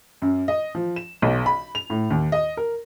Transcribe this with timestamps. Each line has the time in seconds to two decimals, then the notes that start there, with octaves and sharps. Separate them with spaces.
0.22 F#2
0.48 D#5
0.75 F3
0.96 E7
1.22 B1
1.46 B5
1.75 F7
1.90 A2
2.10 D#2
2.32 D#5
2.57 A#4